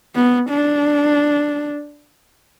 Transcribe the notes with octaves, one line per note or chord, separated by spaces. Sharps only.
B3
D4